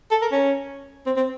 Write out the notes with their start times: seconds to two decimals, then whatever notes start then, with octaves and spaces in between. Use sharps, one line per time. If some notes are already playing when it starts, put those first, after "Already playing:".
0.11 A4
0.21 A#4
0.32 C#4
1.06 C4
1.16 C4